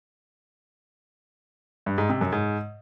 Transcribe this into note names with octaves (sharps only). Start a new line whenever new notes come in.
G2
G#2
C3
F#2
G#2